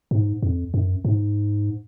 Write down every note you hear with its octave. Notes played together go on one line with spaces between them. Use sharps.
G#2
F2
F#2
G#2